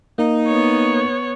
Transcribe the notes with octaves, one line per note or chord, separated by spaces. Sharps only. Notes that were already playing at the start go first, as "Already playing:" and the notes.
A#3 D#4
B3 C#5